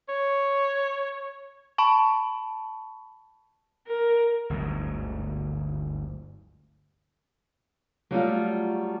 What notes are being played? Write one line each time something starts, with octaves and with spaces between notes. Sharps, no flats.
C#5
A5 B5 C#6
A#4
G1 D2 G#2 F#3
F#3 G3 A3 F4